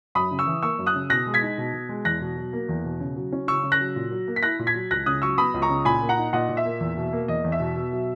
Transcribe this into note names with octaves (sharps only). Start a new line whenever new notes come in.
F#2 B5 D#6
C#3
C#6 E6
E3
A#3 C#6 E6
F#2
D#6 F#6
C#3
B2 F#6 A#6
G#3
G#6 B6
D#4
B2
B2
G#3
E2 F#6 A#6
B2
F#3
A#3
E2
B2
C#3
F#3
C#4
C#3 C#6 E6
C#3
F#6 A#6
F#3
A#2
F#3
A#3
B6
E4 F#6 A#6
A#2
G#6 B6
F#3
C#2 F#6 A#6
C#3 D#6 F#6
F#3 C#6 E6
B3 B5 D#6
C#2
A#5 C#6
C#3
A#2 G#5 B5
A#3
F#5 A#5
D#4
A#2 D#5 F#5
A#2
E5
A#3
E2
B2
A#3
E2 D#5
E2
E5
B2
B2
F#3